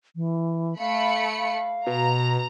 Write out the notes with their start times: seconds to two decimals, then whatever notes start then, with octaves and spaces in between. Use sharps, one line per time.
0.16 E3
0.79 A3 F5 B5 C#7
1.39 F5
1.87 B2 A#5